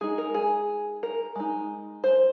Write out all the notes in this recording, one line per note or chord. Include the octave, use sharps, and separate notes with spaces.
G#3 D#4 G#4
A#4
G#4
A#4
G#3 D#4
C5